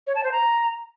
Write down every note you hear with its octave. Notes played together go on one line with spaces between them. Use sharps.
C#5
A5
C5
A#5